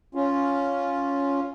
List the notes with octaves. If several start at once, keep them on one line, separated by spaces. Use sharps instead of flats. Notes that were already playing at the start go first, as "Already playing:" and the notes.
C#4 F4